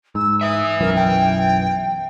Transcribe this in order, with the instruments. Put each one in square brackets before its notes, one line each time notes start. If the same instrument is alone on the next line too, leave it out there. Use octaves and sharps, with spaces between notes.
[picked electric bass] G#2 [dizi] E6
[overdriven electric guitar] B4 E5 [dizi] D#6
[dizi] D#6
[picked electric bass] B1 F#2 E3 [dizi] A#4
[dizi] G5